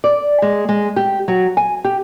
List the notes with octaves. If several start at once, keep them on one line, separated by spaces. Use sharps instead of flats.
D5
G#3
G#3
G4
F#3
G#5
G4